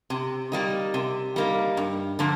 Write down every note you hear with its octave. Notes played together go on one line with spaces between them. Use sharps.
C3
G3 A#3 D#4
C3
G3 A#3 D#4
G2
D3 F3 A#3